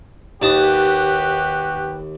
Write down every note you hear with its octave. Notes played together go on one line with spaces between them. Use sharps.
D#2 F#4 G4 B4 A5 D#6